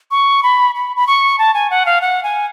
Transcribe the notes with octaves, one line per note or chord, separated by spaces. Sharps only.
C#6
B5
B5
B5
C#6
A5
G#5
F#5
F5
F#5
G#5